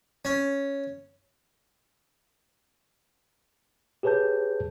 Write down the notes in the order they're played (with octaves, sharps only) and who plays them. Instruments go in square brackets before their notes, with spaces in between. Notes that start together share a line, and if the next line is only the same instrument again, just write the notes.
[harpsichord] C#4
[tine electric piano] G4 G#4 B4 C#5 A5 G6